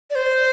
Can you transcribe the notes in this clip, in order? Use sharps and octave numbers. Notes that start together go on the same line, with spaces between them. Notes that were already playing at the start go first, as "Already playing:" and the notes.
D5
C5